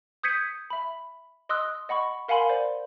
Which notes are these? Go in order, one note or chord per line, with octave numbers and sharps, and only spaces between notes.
D#6 G6 G#6 B6 C#7 D#7
E5 B5
D#5 C6 D#6 E6 F#6
D#5 F#5 B5 C#6
A#4 F5 F#5 G#5 B5 C6
C5 D5